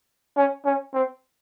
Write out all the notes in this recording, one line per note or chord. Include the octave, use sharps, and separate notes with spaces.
C#4
C#4
C4